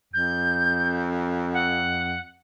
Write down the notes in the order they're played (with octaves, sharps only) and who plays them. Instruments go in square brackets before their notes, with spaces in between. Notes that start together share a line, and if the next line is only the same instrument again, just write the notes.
[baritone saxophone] F2 [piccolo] G6
[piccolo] F#5